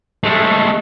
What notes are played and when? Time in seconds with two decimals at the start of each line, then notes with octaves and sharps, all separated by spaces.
0.24 G#3 A3